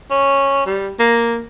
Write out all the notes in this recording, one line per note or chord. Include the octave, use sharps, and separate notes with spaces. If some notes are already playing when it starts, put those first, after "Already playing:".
C#4
G3
A#3